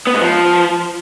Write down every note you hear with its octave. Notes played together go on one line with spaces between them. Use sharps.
B3
G#2
F3